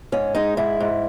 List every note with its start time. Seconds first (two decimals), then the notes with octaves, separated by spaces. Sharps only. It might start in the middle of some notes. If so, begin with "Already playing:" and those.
0.12 G#2 C#4
0.35 G#3 D#4
0.57 G#2 E4
0.80 G#2